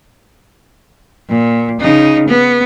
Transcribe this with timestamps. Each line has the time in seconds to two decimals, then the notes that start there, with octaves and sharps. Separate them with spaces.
1.29 A#2
1.80 C#3 D#4
2.28 B3